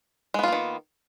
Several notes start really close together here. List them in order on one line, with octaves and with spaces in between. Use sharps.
G#3 B3 F4 A#3 D#3